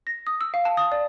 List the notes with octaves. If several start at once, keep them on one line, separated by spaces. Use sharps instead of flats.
A#6
D#6
E6
F5
A5
D#6
D5